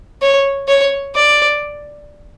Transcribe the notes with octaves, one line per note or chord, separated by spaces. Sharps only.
C#5
C#5
D5